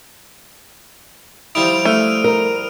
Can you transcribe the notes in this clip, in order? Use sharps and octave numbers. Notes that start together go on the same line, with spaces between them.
F3 G3 E4 D#6 D7 F7
A3 F6 D#7
A#4